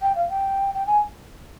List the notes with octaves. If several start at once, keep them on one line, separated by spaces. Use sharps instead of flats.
G5
F5
G5
G5
G#5